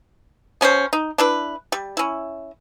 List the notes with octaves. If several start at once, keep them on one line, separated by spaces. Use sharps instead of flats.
B2 C#4 D4 C5
D#4
D4 E4 B4
G3
C#4 E4